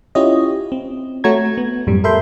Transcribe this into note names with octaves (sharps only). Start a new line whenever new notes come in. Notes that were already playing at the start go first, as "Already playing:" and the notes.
C#4 E4 F4 G4 C#5 D#5
C4
A3 F#4 C#5 A#5 G#6
B3
F#2 A2 G3
A4 A#4 E5 B5 C6 G6